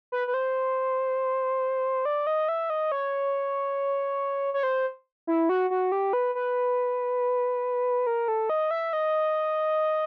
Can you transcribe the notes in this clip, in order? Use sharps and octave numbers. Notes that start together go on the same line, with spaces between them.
B4
B4
C5
D5
D#5
E5
D#5
C#5
C#5
C5
E4
F#4
F#4
G4
B4
B4
A#4
A4
D#5
E5
D#5